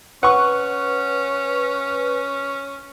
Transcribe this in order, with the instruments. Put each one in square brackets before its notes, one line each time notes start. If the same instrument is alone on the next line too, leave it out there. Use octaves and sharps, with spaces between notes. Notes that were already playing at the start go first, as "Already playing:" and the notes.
[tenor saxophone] C#4 [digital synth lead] B4 [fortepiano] F#5 C#6